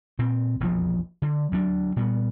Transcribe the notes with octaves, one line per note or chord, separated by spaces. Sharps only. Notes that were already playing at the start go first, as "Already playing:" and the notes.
A#2 C4
E1 A#1 F2 F3
D3
D2 F#3 D4
A#2 G3 B3